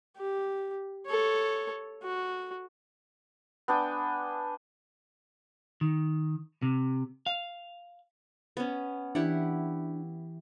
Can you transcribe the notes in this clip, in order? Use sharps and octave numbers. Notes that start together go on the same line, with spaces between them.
G4
A4 C#5
F#4
B3 D4 G5 G#5
D#3
C3
F5
B3 C#4
E3 D4 E4 G4 F#5